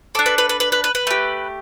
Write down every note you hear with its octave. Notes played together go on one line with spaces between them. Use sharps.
D4 A4 D6
B4
B4
B4
B4
B4
B4
B4
A3 G4